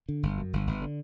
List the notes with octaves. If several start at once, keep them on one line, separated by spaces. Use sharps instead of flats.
D3
G1
F#2
G1
G1
D3